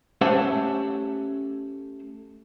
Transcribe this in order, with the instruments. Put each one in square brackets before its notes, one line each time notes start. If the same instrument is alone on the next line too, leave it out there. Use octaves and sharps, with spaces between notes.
[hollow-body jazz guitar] A3 C#4 G4 C5 E5 F#5